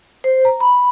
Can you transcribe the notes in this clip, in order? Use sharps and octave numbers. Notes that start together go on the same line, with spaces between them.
C5
A#5
B5